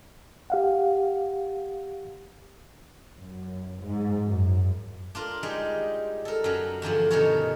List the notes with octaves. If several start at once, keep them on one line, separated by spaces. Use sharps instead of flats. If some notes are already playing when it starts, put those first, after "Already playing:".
G4 F5 F#5
F#2
G#2
F#2
D4 F4 A#4
G3 G#3 D#4 D5
A4 A#4
F#2 F#3
E2 G2 D3 F3
B2 D#3 C#4 A4 A#4 C#5